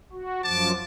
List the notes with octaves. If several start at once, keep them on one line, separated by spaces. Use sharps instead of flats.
F#4
F#2 F3 A5 D6